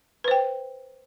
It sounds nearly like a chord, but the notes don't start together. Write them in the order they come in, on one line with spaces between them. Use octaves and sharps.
B4 C5 G5